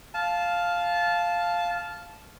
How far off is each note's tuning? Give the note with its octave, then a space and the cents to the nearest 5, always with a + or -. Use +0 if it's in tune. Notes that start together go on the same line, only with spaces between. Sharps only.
F5 +0 A5 -15